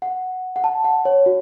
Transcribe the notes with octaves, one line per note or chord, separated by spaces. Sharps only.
F#5
F#5
A5
F#5
C#5
F#4